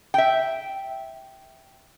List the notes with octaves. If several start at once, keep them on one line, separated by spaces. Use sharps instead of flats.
E5 G5